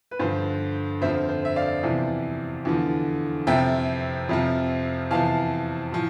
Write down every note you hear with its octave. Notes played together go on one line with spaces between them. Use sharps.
B4
G2 D3 F3 C5
F2 D3 F3 C5 E5
C5
E5
D5 F5
E2 C3 F3
E2 D3 F3
F2 C3 F3 E5 G5
F2 C3 F3
E2 C3 F3 F5 A5
A2 F3